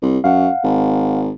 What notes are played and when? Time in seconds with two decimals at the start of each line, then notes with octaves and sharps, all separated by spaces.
0.02 C2
0.24 F#2 F5 F#5
0.63 G#1